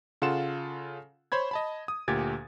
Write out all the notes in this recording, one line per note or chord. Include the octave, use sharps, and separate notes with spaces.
C#3 F4 A4 F#5 C6 E7
C5 C#5 B5 G#6
D#5 A5 B5
D#6
D2 A#2 G4 G#6 A6